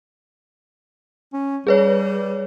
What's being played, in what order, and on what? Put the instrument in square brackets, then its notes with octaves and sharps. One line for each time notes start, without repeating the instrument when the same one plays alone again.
[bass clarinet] C#4
[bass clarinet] G3 [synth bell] G#4 B4 C#5